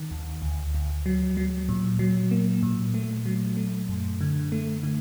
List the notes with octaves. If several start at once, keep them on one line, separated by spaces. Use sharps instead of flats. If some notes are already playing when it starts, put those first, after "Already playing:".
Already playing: D#3
D#2
D2
D2
F#3
F#3
A#2
F#3
A#3
A#2
A3
F#3
A3
F#2
D3
A3
D3